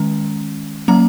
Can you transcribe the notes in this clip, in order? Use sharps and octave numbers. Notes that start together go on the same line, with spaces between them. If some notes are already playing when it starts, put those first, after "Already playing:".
Already playing: D#3 G#3 C#4 A#5
F#3 A#3 C#4 A#5